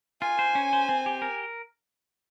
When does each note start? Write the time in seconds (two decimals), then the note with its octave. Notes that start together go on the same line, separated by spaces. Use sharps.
0.22 F4 G#5
0.39 C5
0.55 C#4
0.73 C5
0.89 C4
1.06 G4
1.22 A#4